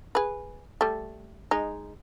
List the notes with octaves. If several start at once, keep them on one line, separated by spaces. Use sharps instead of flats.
G#4 B4
G3 A3
G#3 D#4